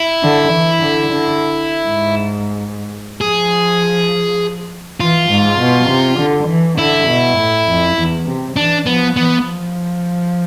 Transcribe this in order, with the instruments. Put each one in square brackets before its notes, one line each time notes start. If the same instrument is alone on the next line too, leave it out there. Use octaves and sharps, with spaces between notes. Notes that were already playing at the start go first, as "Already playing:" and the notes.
Already playing: [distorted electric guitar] E4
[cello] D3
E3
D3
D3
G#2
[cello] F3 [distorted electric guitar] G#4
[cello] E3 [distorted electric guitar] F4
[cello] G#2
B2
C3
D3
E3
[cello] D3 [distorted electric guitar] E4
[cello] B2
A2
F2
E2
C3
[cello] E3 [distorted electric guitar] D4
[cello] F3 [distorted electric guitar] B3
[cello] E3 [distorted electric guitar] B3
[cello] F3